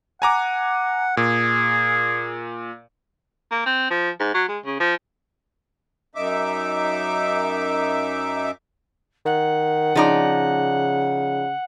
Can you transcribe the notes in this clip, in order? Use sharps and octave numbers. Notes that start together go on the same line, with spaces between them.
F#5 G#5 A#5 D6
A#2 G#4
A#3
C4
F3
G#2
F#3
G#3
C#3
F3
F#2 D#4 E5 D6
D#3 F#5
C#3 F3 D#4 D5